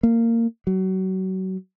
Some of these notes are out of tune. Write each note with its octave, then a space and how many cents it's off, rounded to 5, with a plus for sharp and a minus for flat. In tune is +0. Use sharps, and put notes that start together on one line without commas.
A#3 -20
F#3 +30